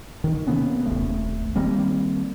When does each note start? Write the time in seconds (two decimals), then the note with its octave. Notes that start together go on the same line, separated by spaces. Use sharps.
0.24 D#3
0.47 C3 A#3 B3 C#4
0.86 D#1 G#1 A3
1.56 D#3 G3 A#3 C4